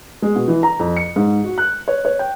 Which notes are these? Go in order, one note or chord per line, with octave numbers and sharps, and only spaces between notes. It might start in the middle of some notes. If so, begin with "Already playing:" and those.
G#3
B2
E3
A#5
F2
C#7
G#2
F#4
F#6
C#5
C#5
G5